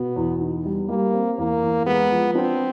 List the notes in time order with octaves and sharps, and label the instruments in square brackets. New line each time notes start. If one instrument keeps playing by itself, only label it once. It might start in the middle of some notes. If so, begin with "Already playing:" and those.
Already playing: [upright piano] B2 [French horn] B3
[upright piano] E2
D#4
G3
[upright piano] G3 [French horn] A#3
[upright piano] C4
[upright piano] E2 [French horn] A#3
[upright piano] E2
[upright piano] G#3 [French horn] B3
[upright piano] F3
[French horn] C4 [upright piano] D4